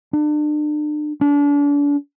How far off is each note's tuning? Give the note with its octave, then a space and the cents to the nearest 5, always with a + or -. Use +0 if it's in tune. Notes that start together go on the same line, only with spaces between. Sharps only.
D4 +35
D4 -35